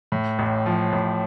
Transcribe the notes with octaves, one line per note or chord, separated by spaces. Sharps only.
A2
A1
F3
A1